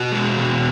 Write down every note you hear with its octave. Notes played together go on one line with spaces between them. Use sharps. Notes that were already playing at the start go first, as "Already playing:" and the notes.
Already playing: B2 F#4
G#3
B2